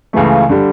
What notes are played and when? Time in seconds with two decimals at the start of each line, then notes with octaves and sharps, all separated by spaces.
0.13 C#2 C#3 E3 A3
0.49 D3 G3